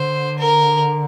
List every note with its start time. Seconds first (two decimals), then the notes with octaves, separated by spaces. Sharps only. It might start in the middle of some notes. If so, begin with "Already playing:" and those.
Already playing: D3 C5
0.39 A#4